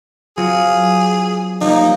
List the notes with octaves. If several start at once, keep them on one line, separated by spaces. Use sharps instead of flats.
F#3 C4 F4 G#4
F3 G3 A#3 D#4